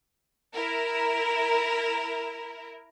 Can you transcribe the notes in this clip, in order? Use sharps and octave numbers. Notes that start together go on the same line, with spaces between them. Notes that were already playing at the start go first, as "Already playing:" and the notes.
E4 A#4